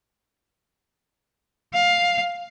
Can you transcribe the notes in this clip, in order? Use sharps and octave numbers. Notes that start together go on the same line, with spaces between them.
F5